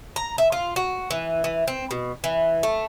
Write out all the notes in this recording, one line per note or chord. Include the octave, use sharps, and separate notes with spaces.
A#5
E5
F4
F#4
E3
E3
C4
B2
E3
A3